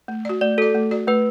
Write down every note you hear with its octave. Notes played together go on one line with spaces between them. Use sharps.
A3
F#4 D5
A3 D5
F#4 A4 D5
A3
F#4 D5
A3 B4